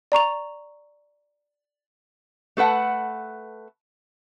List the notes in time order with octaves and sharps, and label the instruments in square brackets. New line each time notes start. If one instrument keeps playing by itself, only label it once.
[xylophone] D5 A#5 C#6 F7
[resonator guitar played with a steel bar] A3 A4 B4 F#5